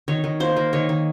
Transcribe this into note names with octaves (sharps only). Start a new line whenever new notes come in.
D#3 C#5
D#3
A#3 C5
A#3
D#3 C#5
D#3